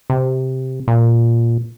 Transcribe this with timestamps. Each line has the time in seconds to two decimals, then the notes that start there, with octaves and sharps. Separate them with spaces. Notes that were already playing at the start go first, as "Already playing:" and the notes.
0.10 C3
0.88 A#2